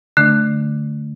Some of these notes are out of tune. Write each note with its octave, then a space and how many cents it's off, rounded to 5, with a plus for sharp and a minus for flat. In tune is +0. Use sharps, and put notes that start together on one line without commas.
D3 +0 A3 +0 D4 +0